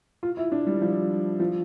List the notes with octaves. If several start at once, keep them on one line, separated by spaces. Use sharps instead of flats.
F4
E4
D4
G3
F3
F3